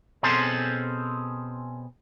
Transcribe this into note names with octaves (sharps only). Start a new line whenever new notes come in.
B2 C4 C#4 G#4 A4 C5